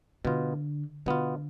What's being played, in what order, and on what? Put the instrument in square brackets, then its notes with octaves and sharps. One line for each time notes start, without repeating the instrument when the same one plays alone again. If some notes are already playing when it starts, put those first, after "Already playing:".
[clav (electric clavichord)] B2 B3 F4 [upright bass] D3
[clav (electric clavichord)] B2 B3 F4 [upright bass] D3